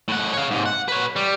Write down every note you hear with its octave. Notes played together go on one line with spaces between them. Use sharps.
A2 F#5
C#5 F5
G#2 C3
F#5
B4 C#5
G3